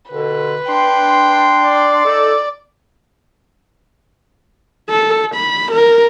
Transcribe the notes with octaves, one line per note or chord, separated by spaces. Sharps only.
D#2 B2 D3 B4
D4 G5 C6
D5
D#4 A4
A4
B5
A#4